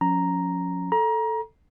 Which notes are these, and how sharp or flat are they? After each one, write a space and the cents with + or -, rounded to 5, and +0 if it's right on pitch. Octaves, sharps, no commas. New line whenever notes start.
F3 +40 C#4 +0 A#5 +0
A4 +0 A#5 +25